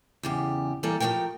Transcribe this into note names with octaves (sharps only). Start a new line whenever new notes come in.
E2 C#3 G4
E3 G3 A#3 A4
F3 A3 G4 A#4 G5